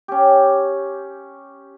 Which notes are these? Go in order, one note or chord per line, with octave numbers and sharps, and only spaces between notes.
C#4 G4